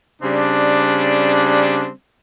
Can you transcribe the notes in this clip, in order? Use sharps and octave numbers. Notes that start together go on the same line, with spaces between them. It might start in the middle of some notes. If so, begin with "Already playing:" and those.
C#3 G3 C4 D4